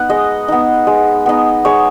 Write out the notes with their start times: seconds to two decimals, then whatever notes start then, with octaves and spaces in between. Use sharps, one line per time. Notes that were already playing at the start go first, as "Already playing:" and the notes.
Already playing: B3 D#4 F#5
0.10 G#3 D#5
0.48 B3 D#4
0.87 G#3
1.26 B3 D#4
1.65 G#3 C#5